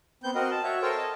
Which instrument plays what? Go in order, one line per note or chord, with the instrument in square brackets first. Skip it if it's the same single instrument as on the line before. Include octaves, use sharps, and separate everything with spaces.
[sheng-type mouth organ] B3 C4 G6
C4 F#4 A#4 D#5
A5
F#4 C#5 E5
A4 A#4 C5 C#5 G5
D#5 A5